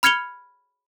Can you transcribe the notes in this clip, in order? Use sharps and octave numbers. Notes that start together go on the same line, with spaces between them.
B5 F6 G#6 C#7 F7 G7